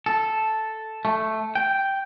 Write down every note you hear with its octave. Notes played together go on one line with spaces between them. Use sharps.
A4
A3
G5